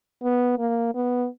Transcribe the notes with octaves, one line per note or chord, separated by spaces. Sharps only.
B3
A#3
B3